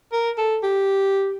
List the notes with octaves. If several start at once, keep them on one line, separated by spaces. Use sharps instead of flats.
A#4
A4
G4